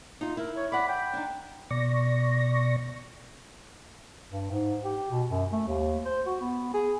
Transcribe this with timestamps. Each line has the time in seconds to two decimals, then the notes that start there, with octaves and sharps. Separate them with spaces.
0.21 D#4 F4
0.37 E4 A#4
0.56 C#5
0.72 D5 F#5 B5
0.88 G5
1.13 D4 D#4
1.71 B2 D5 C#6 A#6
4.32 G2
4.52 G#2
4.84 G4
5.11 B2
5.30 F#2
5.52 A3
5.67 D#2
6.05 C5
6.26 F#4
6.41 B3
6.74 G#4